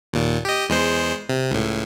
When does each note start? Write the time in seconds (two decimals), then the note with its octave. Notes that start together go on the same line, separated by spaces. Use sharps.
0.13 D#2 A#2
0.45 G4 D#5
0.69 E2 G#3 C5
1.29 C3
1.50 C#2 A2